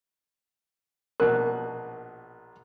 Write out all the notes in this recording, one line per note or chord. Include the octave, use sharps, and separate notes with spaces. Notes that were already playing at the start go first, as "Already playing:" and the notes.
A#1 B2 A#4 F#6